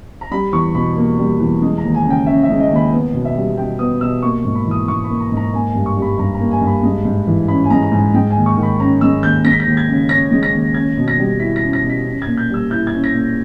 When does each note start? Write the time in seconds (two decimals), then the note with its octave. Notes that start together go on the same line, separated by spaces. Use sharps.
0.21 A#5
0.31 G3 B5
0.53 E2 C#6
0.74 B2 B5
0.97 A#3
1.18 G3
1.40 E2
1.62 G#3
1.78 A#5
1.83 D#2
1.95 G#5
2.05 C#3
2.10 G5
2.27 C#4 E5
2.43 E5
2.49 G#3
2.60 D#5
2.70 D#2
2.76 B5
2.92 B3
3.14 B2
3.25 E5
3.36 G3
3.57 B2 G5
3.79 B3 D#6
4.01 B2 E6
4.23 A#3 C#6
4.45 G#2
4.55 B5
4.66 E3
4.71 D#6
4.87 G#2 C#6
5.04 B5
5.10 A#3
5.20 A#5
5.32 G#2 A#5
5.53 A#3 G#5
5.70 G#5
5.75 G2
5.86 C#6
5.97 G3
6.02 B5
6.18 G2 A#5
6.34 A#5
6.40 A#3
6.51 G#5
6.61 G2
6.67 B5
6.83 G#3
7.05 G#2
7.27 E3
7.48 C#4 B5
7.64 G#5
7.70 G#3 A#5
7.83 A#5
7.92 G#2 G#5
8.14 G#3 G5
8.30 G#5
8.36 D#2
8.46 C#6
8.57 D#3
8.63 B5
8.80 C#4 A#5
9.01 G#3 E6
9.23 D#2 G6
9.45 G#3 A#6
9.52 B6
9.60 A#6
9.66 D#2
9.77 G#6
9.89 C#3
10.09 C#4 A#6
10.31 G#3
10.43 A#6
10.53 D#2
10.74 C#4 G#6
10.97 B2
11.08 A#6
11.18 G3
11.40 E4 B6
11.56 A#6
11.62 C#4
11.73 A#6
11.83 B2
11.90 B6
12.06 C#4
12.22 G#6
12.27 A#2
12.37 G6
12.50 G3 E6
12.70 E4 G6
12.87 G#6
12.92 C#4
13.04 A#6
13.14 A#2